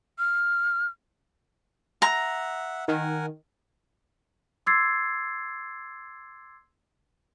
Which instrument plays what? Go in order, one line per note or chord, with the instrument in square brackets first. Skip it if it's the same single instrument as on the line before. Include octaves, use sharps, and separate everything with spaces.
[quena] F6
[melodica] E5 F#5 [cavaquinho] A#5
[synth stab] D#3 [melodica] A#4 F#5 G#5
[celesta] C6 D6 E6 G#6 A6 C7